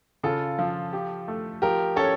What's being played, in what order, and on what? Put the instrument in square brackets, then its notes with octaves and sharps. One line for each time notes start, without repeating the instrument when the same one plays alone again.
[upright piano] C#3 [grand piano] F4 A4
[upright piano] F3
G4
A3
[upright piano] F3 [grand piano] G4 A#4
[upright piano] C#4 [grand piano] A4 C#5